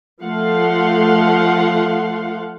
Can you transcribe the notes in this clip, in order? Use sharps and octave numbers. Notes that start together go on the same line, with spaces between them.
F3 A3 F5 F#5 C6